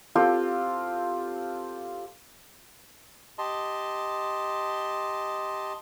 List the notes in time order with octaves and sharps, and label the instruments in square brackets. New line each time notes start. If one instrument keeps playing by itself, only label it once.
[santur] C4 F4 G4 A4
[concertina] G4 D#5 A5 C6